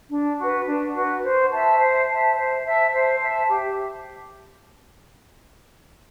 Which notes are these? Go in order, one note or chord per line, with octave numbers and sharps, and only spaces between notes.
D4
F#4 B4
D4
F#4 B4
C5
E5 A5
C5
E5 A5
C5
E5 A5
C5
E5 A5
G4